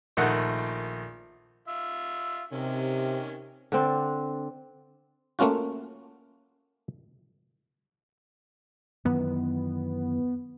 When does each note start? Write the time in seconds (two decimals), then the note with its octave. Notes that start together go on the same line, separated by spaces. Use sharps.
0.17 A#1 D#3 A3 D#5 F#5 F#6
1.68 F4 E5
2.53 C3 D#3 C#4
3.72 D3 C4 D4
5.39 A3 A#3 C#4 F4 F#4
9.05 F#2 D#3 E3 B3